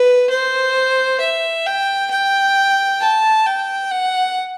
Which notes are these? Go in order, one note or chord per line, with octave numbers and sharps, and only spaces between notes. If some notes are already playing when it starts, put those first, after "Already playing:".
Already playing: B4
C5
E5
G5
G5
A5
G5
F#5